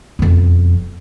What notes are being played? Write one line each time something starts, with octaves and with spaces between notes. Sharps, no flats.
E1 F2